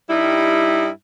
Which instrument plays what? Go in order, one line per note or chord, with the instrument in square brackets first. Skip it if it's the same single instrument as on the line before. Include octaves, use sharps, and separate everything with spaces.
[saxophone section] G2 G3 D#4 E4